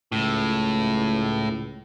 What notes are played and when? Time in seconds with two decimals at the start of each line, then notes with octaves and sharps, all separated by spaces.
0.12 C#2 A2